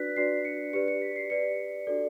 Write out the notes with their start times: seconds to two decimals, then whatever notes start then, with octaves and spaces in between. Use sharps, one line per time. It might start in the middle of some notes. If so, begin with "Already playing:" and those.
Already playing: D4 F#4 B4 D5 F#6 B6
0.16 D4 F#4 B4 D5 C7
0.45 C#7
0.73 G4 B4 D5 C#7
0.88 C#7
1.02 B6
1.16 C7
1.30 G4 B4 D5 C#7
1.87 D4 F#4 A4 D5